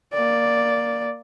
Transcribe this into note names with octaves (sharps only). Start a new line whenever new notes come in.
A#3 D5